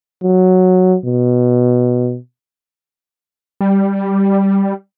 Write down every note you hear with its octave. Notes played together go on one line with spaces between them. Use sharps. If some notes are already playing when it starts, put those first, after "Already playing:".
F#3
B2
G3